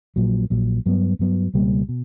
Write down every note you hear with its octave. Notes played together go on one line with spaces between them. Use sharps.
A#1 A#2 F#3
A#1 A#2 F#3
G2 F#3 B3
G2 F#3 B3
C#2 B2 G3 A#3
B2